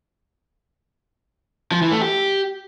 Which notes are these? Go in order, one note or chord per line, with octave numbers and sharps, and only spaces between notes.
F3
E3
A3
G4